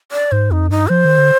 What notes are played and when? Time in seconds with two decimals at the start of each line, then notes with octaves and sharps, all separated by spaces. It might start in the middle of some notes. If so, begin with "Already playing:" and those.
0.12 D5
0.32 G#2 C5
0.51 F2 D#4
0.70 G2 D#4
0.89 F3 C5
1.05 D#3
1.18 D3